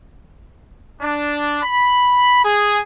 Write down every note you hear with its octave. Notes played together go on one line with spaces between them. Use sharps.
D4
B5
G#4